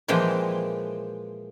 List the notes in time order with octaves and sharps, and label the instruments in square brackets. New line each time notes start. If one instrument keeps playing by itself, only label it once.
[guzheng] A#2 E3 F3 G#3 G5